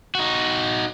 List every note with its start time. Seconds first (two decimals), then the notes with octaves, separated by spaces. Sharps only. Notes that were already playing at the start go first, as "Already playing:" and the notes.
0.15 D#4 F#4